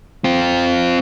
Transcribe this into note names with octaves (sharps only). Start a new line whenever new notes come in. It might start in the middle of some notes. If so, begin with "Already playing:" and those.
C4 F4